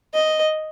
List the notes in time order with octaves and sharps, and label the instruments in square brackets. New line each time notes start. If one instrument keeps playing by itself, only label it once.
[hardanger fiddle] D#5